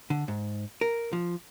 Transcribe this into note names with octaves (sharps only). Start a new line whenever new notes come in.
D3
G#2
A#4
F3